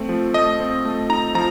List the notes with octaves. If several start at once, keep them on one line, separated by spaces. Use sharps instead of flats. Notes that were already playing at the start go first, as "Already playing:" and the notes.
Already playing: A3 C4
F3
A3 D#5
C4
A3
D#4 A#5
F3 A#5